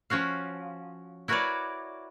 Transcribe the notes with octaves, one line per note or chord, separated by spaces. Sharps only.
F3 C#4 F#4 F5
E4 F#4 A#4 B4 C#5 D5